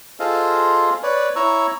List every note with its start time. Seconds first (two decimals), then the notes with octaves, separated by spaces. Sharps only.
0.20 F4 G#4 A4 C5 D#5 F5
1.03 B4 C#5 D5
1.36 E4 C#5 A#5 C#6 E6